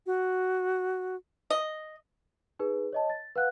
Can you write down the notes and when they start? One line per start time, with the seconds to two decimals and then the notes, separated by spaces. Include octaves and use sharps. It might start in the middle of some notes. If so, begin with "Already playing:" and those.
0.06 F#4
1.50 D#5
2.59 D#4 G#4 B4
2.93 C#5 D#5 A5
3.10 A6
3.35 B4 F5 F#5 F#6